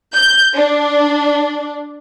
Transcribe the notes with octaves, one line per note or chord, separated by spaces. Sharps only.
G6
D4